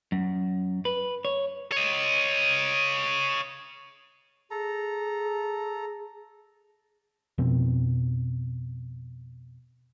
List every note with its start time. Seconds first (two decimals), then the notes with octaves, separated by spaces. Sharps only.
0.12 F#2
0.85 B4
1.25 C#5
1.72 C#5 D#5
4.51 G#4 A4 A#5
7.38 F2 B2 C4